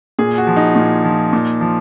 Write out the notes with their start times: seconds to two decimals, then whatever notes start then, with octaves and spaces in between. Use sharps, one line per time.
0.19 A#2 G#4
0.38 F#4
0.47 F3
0.56 D#4
0.76 A#2
1.05 F3
1.33 A#2
1.61 F3